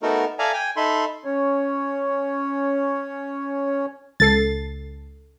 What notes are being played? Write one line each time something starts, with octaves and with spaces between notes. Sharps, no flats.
A3 B3 D#4 F#4 A4 A#4
A4 D5 E5 F5 G#5 A#5
G5 G#5
D#4 A4 E5 B5 C6
C#4 C#5
C#2 A4 A6 C7